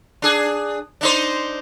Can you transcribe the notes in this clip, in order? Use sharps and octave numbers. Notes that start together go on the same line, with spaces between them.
D4 G#4
D4 D#4 C5